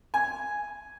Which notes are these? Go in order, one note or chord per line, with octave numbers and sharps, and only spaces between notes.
G#5